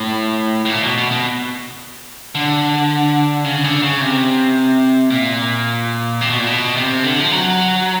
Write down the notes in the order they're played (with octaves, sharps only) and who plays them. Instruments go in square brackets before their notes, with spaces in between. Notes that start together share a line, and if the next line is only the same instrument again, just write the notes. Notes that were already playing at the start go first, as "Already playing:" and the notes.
Already playing: [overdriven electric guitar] A2
A2
A#2
B2
B2
B2
D3
C#3
D3
C#3
C3
A#2
C3
B2
A#2
B2
C3
D3
F3
F#3